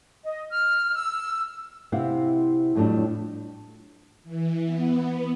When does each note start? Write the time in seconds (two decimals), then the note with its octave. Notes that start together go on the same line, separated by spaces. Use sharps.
0.24 D#5
0.50 F6
0.95 E6
1.92 C3 C4 E4 F5 F#5
2.75 F2 A2 F#3 G3 D4
4.24 E3
4.65 B3